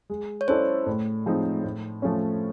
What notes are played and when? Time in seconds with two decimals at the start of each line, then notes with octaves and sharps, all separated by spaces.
0.10 G#3
0.41 C#5
0.48 C#4 E4 A4 C5 D5
0.86 A2
1.26 F3 G#3 C4 D#4
1.64 A2
2.02 F3 A3 C#4